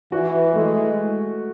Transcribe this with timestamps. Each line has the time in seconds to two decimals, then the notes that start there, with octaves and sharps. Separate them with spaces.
0.12 E3 F#4
0.54 G#3 A3